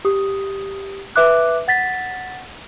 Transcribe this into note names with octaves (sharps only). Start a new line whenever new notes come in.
G4 D#6
B4 E5 D6 F#6
F#5 A6 B6